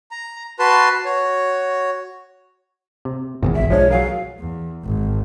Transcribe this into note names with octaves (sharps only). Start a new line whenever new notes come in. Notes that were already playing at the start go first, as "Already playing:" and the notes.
A#5
F#4 B4 A5 C6
F#4 C#5
C3
G#1 E2 G2 B2 E3
B1 E5
F3 G#3 D4 C#5
F#3 G#4 A#4 F5
E2
G#1